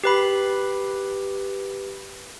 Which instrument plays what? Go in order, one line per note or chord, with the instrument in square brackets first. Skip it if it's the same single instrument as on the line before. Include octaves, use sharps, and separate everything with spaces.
[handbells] G4 B4 B5